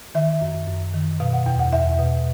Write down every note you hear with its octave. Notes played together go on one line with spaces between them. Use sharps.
D#3 E5
F#2
F#2
D#3
B2 F5
F#5
E2 G5
F#5
E2 E5
B2